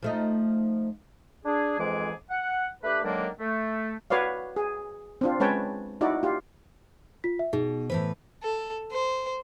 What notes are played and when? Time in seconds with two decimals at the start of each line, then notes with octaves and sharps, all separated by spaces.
0.03 F3 A3 D#4
1.45 D4 G#4
1.79 F2 G#2 E3 G#3 G#4 D6
2.30 F#5
2.83 A3 D4 G4 B4
3.04 D3 D#3 F#3 G#3 A#3 D4
3.40 A3
4.10 F#4 B4 C#5 D5 F5
4.56 G#4
5.21 C4 D4 F4
5.40 G#3 C#4 B4 C#5 G5 A5
6.01 D#4 E4 F#4 D5
6.23 F4 G4
7.24 F4 B6
7.39 E5
7.53 B2 D#4 G#4
7.90 A2 E3 B4 C5
8.43 A4
8.92 C5